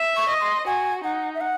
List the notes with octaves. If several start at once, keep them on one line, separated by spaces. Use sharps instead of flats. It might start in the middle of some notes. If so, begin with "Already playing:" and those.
Already playing: E5
C#6
D#5
C6
F#4 G#5
D#4 F#5
E5
F#5